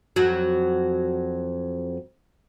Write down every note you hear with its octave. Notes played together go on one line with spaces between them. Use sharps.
F2 F#3